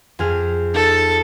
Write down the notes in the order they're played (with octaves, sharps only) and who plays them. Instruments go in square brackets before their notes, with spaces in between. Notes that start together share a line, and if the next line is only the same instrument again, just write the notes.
[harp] F2 G#4 F6
[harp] D#4 [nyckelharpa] A4